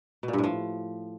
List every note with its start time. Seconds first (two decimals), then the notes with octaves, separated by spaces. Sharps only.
0.23 B2
0.28 A#2
0.33 G2
0.38 A2
0.44 F3